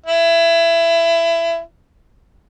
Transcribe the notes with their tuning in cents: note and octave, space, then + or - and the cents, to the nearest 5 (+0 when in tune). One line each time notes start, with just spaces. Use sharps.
E4 +25